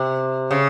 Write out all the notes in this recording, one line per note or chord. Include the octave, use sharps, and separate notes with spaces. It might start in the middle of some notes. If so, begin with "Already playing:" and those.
Already playing: C3
C#3